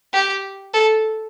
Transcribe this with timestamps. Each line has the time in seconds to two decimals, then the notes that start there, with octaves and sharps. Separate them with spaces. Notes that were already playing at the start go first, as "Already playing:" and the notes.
0.13 G4
0.74 A4